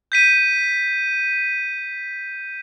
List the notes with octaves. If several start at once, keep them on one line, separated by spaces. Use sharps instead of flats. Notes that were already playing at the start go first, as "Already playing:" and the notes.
G6 B6 D#7